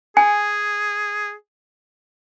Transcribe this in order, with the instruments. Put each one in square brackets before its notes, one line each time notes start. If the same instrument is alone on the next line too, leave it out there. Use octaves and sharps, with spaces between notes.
[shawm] G#4 [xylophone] G#5